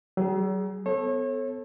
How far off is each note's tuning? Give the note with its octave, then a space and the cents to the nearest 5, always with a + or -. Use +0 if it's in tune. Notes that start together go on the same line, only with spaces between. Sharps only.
F#3 +45 G#4 +0
B3 +30 A4 +0 C#5 -35